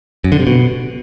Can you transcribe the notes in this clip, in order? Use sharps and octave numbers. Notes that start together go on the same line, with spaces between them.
F#2
D3
C3
B2